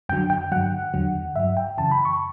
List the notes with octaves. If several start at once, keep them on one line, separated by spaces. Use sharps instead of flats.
F#2 D3 F#3 G5
G5
G2 D3 F#3 F#5
E2 D3 F#3
G2 F#3 E5
G5
F#2 C#3 E3 A5
B5
C#6